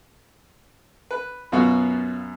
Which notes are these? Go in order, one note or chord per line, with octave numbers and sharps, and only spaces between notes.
B4
F#2 B2 B3 F4 F#4 F#5